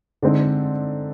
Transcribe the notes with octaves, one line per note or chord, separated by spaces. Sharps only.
D3 G#3 C4 D#4